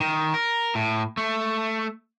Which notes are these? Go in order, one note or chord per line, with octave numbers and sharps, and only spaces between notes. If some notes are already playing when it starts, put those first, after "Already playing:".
D#3
A#4
A2
A3